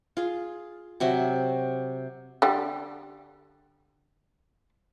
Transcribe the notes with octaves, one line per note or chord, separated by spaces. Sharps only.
F4 G#4
C3 F#3 F#4 E5
D3 G3